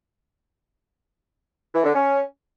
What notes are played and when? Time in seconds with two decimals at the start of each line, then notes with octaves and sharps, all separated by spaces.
1.74 E3
1.84 D3
1.93 C#4